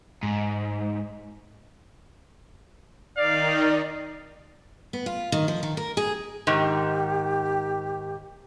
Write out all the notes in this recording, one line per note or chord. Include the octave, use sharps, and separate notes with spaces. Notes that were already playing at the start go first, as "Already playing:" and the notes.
G#2
D#3 D#4 D5 F5
B3
F4
D#3
F3
D#3
A#4
G#4
G#2 D#3 G4